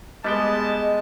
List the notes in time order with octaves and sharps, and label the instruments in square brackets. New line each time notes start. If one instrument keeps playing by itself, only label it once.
[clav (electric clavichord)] G3 B3 G5 [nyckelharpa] G#3 [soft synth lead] D#5 [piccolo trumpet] A5